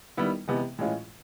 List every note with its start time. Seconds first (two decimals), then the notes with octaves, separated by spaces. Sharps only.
0.17 D#3 G3 B3 E4
0.48 C3 E3 G#3 B3
0.79 A2 E3 G#3 C#4 F4